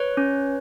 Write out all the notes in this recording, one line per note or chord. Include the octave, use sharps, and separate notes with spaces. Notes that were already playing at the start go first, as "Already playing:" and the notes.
Already playing: B4 C#5
C#4